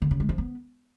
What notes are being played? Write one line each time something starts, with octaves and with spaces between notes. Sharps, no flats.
D3
C#3
G#3
F3
B3